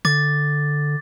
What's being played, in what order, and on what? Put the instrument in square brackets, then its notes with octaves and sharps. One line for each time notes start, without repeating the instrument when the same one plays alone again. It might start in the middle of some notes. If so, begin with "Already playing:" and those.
[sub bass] D3 [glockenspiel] D6 A6